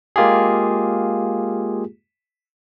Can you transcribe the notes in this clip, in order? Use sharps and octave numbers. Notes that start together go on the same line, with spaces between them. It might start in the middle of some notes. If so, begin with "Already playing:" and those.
G#3 A#3 F4 G4 G#4